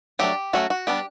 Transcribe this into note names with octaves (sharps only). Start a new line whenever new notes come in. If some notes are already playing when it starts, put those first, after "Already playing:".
F#3 A3 D4 G4
F#3 A3 C#4 F#4
F#4
G3 B3 D4 G4